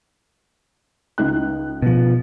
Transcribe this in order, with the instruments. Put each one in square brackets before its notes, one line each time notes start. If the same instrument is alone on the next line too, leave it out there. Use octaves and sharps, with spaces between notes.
[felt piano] C#2 D#4 F#6
[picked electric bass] B2 F3